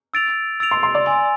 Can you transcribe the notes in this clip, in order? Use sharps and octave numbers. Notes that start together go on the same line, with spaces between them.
E6 A6 D7 F7
E6 A6 D7 F7
C6
C6
D5
G#5 C6 E6